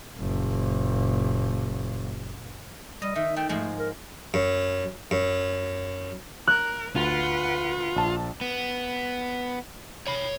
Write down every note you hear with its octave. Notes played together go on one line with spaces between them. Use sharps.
F#1 A#2
G3 D#5
D#3 E5
A3 G5
G#2 F3 G#3 A3
A#4
F#2
F#2
A#4 F#6
D2 F4 B4 F#5
A#1 A5
B3
C#5 B5